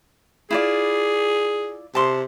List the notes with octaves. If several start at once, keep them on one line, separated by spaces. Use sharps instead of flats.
E4 F4 G#4 D5
C3 A5 C6